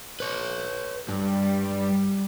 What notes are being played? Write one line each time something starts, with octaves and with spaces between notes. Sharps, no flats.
B4 C#5
G2 G3